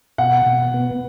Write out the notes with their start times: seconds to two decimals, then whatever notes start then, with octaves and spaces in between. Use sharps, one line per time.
0.18 B2 F#5
0.46 B2
0.74 B3